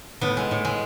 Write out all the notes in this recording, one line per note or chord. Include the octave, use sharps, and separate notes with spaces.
A2 B3
G#3
A2
G#3